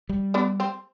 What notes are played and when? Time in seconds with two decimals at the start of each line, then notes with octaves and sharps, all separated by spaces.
0.09 G3
0.34 B3 D4
0.60 C4